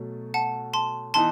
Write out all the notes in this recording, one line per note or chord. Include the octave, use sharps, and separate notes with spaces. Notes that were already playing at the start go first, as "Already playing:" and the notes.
Already playing: B2 F#3 A3
F#5 A5
A5 C6
E3 B3 D#4 A5 C6